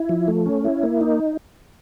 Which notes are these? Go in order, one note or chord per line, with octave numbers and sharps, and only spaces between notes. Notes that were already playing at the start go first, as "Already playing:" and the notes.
Already playing: E4
F3
A3
C#4
E4
A#3
D#4